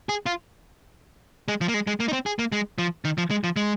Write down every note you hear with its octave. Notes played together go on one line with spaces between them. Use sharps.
G#4
F4
G#3
F3
A#3
G#3
G#3
A#3
D#4
C4
G#4
A#3
G#3
F3
D#3
F3
G#3
F3
G#3